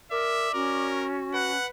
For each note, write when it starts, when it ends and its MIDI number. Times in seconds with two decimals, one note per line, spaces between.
0.11 0.49 70
0.11 0.91 74
0.11 0.53 76
0.54 1.57 61
0.54 1.51 66
0.54 1.08 70
1.34 1.70 71
1.34 1.67 78